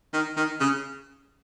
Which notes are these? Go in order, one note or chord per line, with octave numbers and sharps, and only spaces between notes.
D#3
D#3
C#3